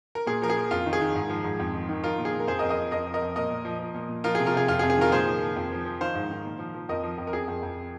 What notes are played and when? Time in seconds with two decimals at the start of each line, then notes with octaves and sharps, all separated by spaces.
0.15 A#4
0.27 A#2 G#4
0.42 F3 A#4
0.50 G#4
0.56 F3
0.71 F2 F4
0.86 D#3
0.93 G#4
1.01 D#3
1.15 G#2
1.29 F3
1.44 G#2
1.60 F2
1.74 D#3
1.89 D#3
2.04 F3 F4 A#4
2.18 A#2
2.25 G#4
2.33 A#2
2.40 A#4
2.47 F2 G#4 C5
2.59 A#4 D#5
2.62 F2
2.69 A#4 D#5
2.77 F3
2.91 F2 A#4 D#5
3.06 F3
3.14 A#4 D#5
3.22 F2
3.36 A#2 A#4 D#5
3.50 A#2
3.65 F3
3.80 F3
3.94 A#2
4.09 A#2
4.24 F3 F4 A#4
4.35 C3 G#4
4.46 F4 A#4
4.53 C3 G#4
4.68 F2 F4
4.79 G#4
4.83 F2
4.90 G#4
4.97 D#3 F4 A#4
5.12 A#2 G#4 C5
5.27 F3
5.42 F3
5.56 F2
5.72 F3
5.85 F3
6.00 D#3 C5 F5
6.15 G#2
6.30 D#3
6.45 A#2
6.59 F3
6.75 F3
6.89 F2 A#4 D#5
7.04 F3
7.18 F2
7.27 A#4
7.33 F2 G#4
7.48 F2
7.63 F2